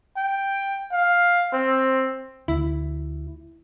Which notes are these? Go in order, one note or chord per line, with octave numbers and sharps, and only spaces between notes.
G5
F5
C4
D2 E4